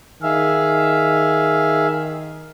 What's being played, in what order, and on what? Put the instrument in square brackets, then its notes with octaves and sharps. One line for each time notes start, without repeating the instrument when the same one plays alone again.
[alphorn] D#3 [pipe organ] G#4 E5 F5